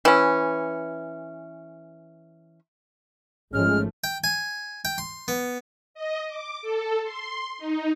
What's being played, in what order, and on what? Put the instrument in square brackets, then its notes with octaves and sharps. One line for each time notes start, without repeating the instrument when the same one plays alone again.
[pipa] E3 C#4
[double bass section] G#1 F3 A3 [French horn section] G#3 C#4 [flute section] F6
[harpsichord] G5
G#5
G5
C6
B3
[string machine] D#5
D6
A4
C6
D#4